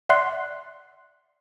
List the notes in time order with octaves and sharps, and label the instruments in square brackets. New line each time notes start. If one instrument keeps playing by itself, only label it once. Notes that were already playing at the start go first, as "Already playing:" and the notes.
[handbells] D5 E5 F#5 C6 F#6 C7